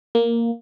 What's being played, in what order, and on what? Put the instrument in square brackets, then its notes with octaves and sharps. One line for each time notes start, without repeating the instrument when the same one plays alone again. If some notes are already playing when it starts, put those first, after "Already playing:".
[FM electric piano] A#3